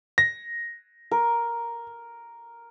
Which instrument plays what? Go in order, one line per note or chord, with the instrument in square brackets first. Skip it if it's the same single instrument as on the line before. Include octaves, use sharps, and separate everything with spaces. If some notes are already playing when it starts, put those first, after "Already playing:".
[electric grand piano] A#6
[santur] A#4